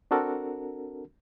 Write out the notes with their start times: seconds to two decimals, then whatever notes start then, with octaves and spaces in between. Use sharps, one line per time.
0.11 C4 D4 F#4 A4 A#4